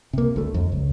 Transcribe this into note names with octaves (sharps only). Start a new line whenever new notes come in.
C3 A#3
D2 A3
F2
C#2